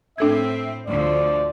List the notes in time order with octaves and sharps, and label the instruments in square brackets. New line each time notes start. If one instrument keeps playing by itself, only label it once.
[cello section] A2 C4 [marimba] D4 A4 G#6 [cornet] E5
[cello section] D2 D3 F3 [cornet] D5